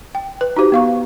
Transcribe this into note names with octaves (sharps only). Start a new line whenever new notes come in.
G5
B4
D#4 F#4 G4 C5
B3 F5 C#6